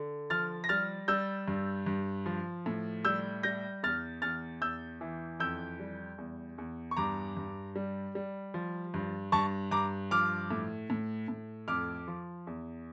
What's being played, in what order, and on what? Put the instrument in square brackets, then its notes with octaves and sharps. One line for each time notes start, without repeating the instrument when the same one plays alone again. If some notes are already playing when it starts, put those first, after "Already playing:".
Already playing: [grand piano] D3
F3 F6 A6
A#6
G3 F6 A6
G3 E6 G6
G2
G2
F3
A2
G3 E6 G6
G3 G6 A#6
E2 F6 A6
E2 F6 A6
E2 E6 G6
E3
F2 E6 G6
G3
E2
E2
C#6
G2 A#5 D6
G2
G3
G3
F3
G2
G2 A5 C#6
G2 A#5 D6
F3 D6 F6
A2
A2
A2
F2 D6 F6
F3
E2